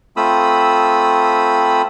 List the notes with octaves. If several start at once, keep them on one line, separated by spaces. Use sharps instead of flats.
A3 C4 F4 B5 D#6 E6